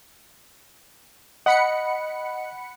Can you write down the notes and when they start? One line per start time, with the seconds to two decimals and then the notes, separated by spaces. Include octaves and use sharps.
1.46 D#5 F#5 B5 C#7